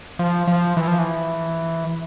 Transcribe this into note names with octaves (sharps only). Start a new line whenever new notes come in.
F3
F3
E3
F3
E3